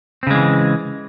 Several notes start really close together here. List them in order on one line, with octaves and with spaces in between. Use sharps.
C4 C#3 G#3 E3